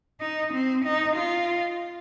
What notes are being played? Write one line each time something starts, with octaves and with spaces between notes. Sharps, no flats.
D#4
C4
D#4
F4